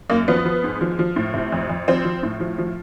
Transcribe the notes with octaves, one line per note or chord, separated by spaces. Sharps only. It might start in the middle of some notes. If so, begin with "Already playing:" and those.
F#2 A#3
F3 B3
F3
G#2
F3
F3
A2
C3
F2
F2
F3 C4
F3
A2
F3
F3